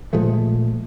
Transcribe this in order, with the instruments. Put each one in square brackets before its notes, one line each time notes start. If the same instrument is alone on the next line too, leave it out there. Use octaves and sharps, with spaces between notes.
[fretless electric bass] A#2 F3 G#3 A3